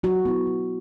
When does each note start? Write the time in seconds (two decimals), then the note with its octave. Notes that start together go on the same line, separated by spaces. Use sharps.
0.03 F#3 F#4
0.25 B3 E4
0.47 F#3